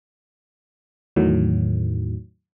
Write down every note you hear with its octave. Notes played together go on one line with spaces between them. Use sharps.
E2 A2 D#3 F#3